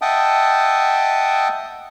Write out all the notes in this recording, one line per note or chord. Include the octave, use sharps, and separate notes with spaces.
D#5 E5 F#5 G5 A5 D#6